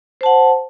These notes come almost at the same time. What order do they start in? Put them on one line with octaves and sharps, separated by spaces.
C5 A5 F#5